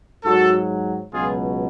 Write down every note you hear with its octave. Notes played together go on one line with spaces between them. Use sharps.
G#2 F#3 F#4 A4
C#2 B2 F#3 F4 G#4